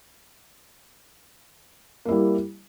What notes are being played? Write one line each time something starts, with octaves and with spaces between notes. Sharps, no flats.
G3 A#3 E4